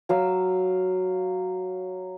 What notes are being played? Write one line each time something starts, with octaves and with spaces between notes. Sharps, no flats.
F#3 F5 E6